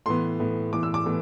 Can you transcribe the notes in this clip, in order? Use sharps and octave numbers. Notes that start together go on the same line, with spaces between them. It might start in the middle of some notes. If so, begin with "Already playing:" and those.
A2 E3 B3 C6
A2 E3 B3
A2 E3 B3 D6
E6
D6
A2 E3 B3